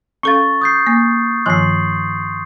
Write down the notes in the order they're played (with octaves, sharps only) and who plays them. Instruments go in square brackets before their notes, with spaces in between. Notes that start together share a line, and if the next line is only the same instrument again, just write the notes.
[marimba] C#4 A4 F5 [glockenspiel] C#6 A6
[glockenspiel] D#6 G6 C7
[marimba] A#3
[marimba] G2 D#3 F3 [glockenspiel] C6 C7